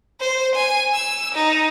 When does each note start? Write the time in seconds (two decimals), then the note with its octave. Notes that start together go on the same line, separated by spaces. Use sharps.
0.20 C5
0.55 G#5
0.94 E6
1.34 D#4